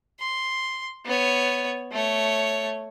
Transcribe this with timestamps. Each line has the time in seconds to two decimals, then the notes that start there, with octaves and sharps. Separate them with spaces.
0.20 C6
1.05 B3 C#5
1.92 A3 C#5